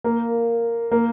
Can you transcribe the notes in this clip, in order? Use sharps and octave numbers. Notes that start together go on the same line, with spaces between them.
A#3
A#3